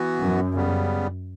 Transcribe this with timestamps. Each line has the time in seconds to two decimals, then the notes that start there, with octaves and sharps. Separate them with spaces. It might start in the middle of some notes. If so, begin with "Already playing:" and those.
Already playing: E3 B3 F#4
0.21 F#2
0.55 C#3 G3 B3